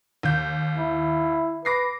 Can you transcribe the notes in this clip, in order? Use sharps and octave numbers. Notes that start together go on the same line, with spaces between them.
D#2 G6
E4
B4 D6 A#6 C7